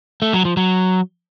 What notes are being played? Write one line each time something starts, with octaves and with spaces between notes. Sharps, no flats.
A3
F#3
F3
F#3